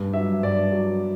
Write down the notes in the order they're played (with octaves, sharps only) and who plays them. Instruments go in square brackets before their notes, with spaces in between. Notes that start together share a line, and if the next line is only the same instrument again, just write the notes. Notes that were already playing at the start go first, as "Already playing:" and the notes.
Already playing: [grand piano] G2
F#3 E5
G2 D5
F#3